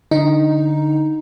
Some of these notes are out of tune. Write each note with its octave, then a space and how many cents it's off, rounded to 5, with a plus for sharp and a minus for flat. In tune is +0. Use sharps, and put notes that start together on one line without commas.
D3 +0 D#4 +0